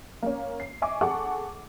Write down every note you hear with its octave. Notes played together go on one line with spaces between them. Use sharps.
A#3 C#4
C7
D#5 E5 G#5 C#6 D6
G#4 A4 F#5 C#6 D6